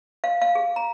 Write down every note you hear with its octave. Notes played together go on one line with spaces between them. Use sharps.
F5
F5
G#4
A#5